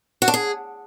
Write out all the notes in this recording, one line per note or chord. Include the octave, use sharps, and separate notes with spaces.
F#4
D4
G#4